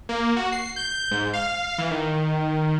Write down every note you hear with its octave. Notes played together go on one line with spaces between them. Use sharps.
A#3
F#4
C7
G6
G#2
F5
E3
D#3